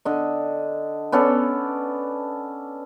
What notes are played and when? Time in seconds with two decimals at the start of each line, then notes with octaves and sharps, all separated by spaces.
0.05 D3 D#5
1.12 B3 C#4 A4 D5